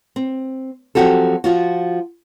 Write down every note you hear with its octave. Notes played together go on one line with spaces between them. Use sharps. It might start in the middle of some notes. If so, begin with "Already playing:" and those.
C4
F3 F#3 C4 F#4 G4 A4
F3 F4 F#4